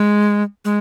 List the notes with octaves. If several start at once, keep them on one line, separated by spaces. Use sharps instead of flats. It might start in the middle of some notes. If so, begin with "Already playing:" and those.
Already playing: G#3
G#3